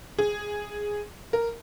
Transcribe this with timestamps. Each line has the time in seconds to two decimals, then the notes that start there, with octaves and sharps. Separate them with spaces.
0.19 G#4
1.33 A#4